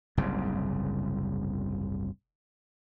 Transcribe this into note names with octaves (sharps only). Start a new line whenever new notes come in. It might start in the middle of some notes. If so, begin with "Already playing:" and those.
F#1 C2 G#2 C#3